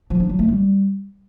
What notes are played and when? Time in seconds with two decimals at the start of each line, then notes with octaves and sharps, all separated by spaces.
0.10 F3
0.20 D4
0.29 F#3
0.39 A3
0.49 G3